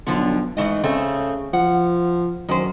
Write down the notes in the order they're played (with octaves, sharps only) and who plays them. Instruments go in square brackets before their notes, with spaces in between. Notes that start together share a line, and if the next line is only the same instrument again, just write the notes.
[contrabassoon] B1 [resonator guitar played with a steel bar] D3 F3
[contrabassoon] G#2 [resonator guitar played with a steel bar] E3 A3 D#5
[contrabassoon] C#3 [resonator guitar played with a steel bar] A3 C4
[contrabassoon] F3 [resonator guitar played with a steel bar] F#5
[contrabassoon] F#2 [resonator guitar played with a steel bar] D#3 C5